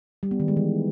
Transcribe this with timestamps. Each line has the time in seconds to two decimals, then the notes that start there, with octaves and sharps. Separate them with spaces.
0.23 G3
0.31 B3
0.40 D#3
0.48 G#3
0.57 E3